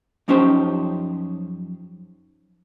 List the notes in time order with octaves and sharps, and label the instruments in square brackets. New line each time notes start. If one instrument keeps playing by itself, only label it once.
[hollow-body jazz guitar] F#2 F3 C#4 D#4 G4 C5